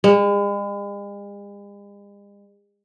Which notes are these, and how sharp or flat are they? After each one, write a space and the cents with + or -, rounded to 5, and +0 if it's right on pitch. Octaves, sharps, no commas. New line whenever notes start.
G#3 -45